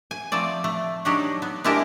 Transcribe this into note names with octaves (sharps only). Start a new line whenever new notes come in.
G#5
F3 A3 C4 D5
A3
F#3 D4 D#4 G4 C#5 F#5
B3
G#3 D4 E4 G4 A4 A#4